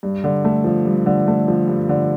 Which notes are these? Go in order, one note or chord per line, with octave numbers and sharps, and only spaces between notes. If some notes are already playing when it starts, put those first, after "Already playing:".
G2
D3
A3
F3
G2
D3
A3
F3
G2
D3